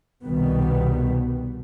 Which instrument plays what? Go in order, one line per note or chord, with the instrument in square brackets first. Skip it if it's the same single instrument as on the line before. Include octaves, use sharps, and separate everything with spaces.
[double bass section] C2 B2 D#3 G3 B3